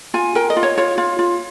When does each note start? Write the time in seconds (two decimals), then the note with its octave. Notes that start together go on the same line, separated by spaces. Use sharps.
0.14 F4 G#5
0.35 A#4 G5
0.50 D#5
0.57 F4
0.63 C#5
0.78 F4 C#5
0.98 F4
1.19 F4